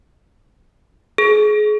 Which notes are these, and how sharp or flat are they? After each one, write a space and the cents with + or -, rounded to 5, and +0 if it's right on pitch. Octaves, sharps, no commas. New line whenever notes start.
G#4 +30